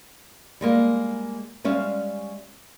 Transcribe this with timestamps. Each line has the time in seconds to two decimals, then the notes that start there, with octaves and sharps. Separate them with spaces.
0.61 G3 G#3 A#3
1.64 G3 G#3 C#4 E5 F5